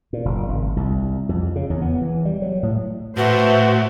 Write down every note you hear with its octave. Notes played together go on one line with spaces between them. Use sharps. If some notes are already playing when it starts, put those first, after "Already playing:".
A#2
F#1
G#1
C2
F2
C#3
E2
B3
E3
G3
F#3
A2
A2 F#4 B4 C5 E5